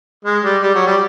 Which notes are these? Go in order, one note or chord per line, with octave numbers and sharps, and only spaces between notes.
G#3
G3
G3
F#3
G3